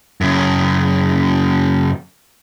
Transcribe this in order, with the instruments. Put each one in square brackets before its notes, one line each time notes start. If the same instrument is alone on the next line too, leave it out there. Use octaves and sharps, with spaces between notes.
[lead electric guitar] F#2 C#3